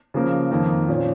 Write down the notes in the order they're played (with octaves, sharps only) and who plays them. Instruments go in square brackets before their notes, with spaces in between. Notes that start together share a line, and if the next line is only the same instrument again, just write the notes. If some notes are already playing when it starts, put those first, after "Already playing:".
[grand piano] C#3 F3 A#3
F2 D#3 A#3
A#2 F3 C#4